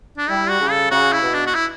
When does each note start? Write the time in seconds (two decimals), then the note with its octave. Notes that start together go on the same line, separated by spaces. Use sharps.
0.18 D4
0.29 G3 E4
0.50 F#4
0.60 C#3
0.71 A4
0.91 C#3 F#4
1.13 E4
1.23 B2
1.34 D4
1.47 F#4
1.55 E4